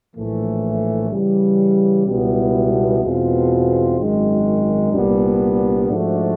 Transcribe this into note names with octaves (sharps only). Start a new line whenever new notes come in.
A#1 A2 E3 A3
C#3 E3 G3
C#2 B2 G3 B3 E4
E2 B2 G#3 C4 F4
G#1 F#2 D#3 G#3
C2 A#2 G3 B3 D4
G#2 F3 A3 D4 F#4